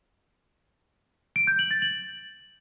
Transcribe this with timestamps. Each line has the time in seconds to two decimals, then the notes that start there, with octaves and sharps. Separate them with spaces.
1.36 D7
1.47 G6
1.59 F#7
1.71 A6
1.82 F#7